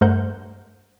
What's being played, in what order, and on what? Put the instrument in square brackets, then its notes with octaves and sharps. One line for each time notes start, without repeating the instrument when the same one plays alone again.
[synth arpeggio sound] G2 A3 A#4 C5 F#5 G6